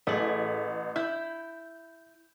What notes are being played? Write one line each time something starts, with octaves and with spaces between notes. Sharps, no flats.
A1 A3 G#4 F#7
E4 G6